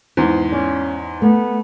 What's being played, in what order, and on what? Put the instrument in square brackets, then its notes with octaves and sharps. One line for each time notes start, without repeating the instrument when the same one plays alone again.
[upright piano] E2 G#2 [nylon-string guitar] C5
[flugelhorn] C#4 [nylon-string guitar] D5
[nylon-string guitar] A3 [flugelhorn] B3